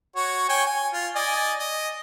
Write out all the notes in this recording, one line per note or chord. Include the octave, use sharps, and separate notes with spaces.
F#4 C#5
C#5 G5 G#5
G#5
F4
D5 D#5 G#5
D#5